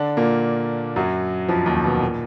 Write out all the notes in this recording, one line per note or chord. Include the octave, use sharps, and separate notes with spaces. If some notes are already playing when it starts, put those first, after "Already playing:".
Already playing: D3 D4
A#2 A#3
F#2 F#3
F2 F3
D#2 D#3
B2
A#2